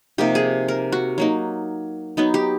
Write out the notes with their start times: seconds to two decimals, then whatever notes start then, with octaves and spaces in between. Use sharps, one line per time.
0.18 C3 F3 A#3 D#4 G4
0.35 G#4
0.68 A#4
0.92 F#4
1.18 F#3 A#3 D#4
2.17 F#3 B3 D#4
2.34 G4